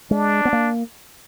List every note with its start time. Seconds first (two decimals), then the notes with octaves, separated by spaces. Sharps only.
0.11 G#3 D4
0.45 B3
0.53 A#3